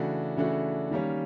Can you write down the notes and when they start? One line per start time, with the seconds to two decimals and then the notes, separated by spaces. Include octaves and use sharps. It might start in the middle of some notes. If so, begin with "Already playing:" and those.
Already playing: C#3 E3 A3 D4 F#4
0.37 C#3 E3 A3 D4 F#4
0.91 D#3 G3 A#3 C#4